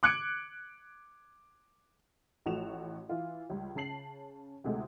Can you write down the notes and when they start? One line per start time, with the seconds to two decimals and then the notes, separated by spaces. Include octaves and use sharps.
0.03 D6 F#6 G#6 C#7 D7
2.46 A1 F3 A3 F#4 E7 F7
3.09 E3 F4
3.50 C#2 G3
3.75 C#3 C#4 A5 C7 F#7
4.64 D2 A2 C3 G#3 A3